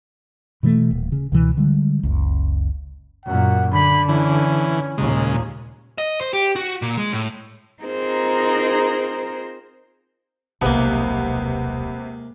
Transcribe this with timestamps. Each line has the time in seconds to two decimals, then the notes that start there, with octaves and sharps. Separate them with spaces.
0.63 B2 E3 F#3 A3
0.91 D#1
1.12 C#3
1.32 C#2 B2 E3
1.57 D3 G3 G#3
2.03 F#1 C#2
3.25 F#2 A#2 F#5
3.73 D3 B5
4.09 E3 C#4
4.98 D#2 A#2 C#3 G#3
5.98 D#5
6.21 C5
6.33 G4
6.56 F#4
6.82 A#2
6.97 G#3
7.13 A2
7.82 C4 D#4 F4 G#4 A#4 C5
10.61 D#1 B1 C3 G#3 A#3 B3